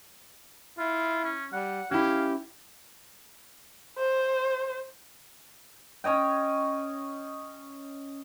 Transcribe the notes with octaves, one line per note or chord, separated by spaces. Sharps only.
E4 F4
C#4
G3 F#5
C#4 E4 G4 F5
C5
C#4 C#5 D#5 G5